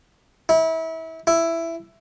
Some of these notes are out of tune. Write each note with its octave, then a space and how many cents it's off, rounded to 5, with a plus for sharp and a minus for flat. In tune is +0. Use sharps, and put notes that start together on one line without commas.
E4 -30
E4 +10